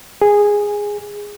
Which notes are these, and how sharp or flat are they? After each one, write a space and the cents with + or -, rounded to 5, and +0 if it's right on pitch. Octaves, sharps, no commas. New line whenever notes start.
G#4 -10